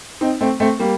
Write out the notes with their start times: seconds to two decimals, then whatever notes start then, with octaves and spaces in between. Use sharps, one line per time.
0.21 C4 D#4
0.41 A3 C4
0.60 A3 C4
0.79 G3 A#3